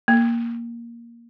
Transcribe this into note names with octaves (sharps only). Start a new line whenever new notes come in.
A#3